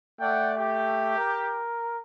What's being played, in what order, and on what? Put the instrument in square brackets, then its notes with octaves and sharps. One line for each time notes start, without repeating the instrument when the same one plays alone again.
[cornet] A3 [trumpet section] D5 F#5 G5
[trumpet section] G4
[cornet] A#4